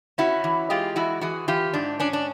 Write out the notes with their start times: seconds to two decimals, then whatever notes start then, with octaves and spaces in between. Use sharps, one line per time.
0.18 C#4 E4 F#4
0.44 E3
0.70 G#3 F4 G4
0.96 E3 E4 F#4
1.21 E3 F#4 G#4
1.48 E3 F4 G4
1.74 G#2 D4
2.00 C#4 D4
2.13 D4